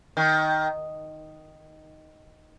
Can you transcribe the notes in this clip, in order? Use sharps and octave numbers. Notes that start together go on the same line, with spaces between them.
D#3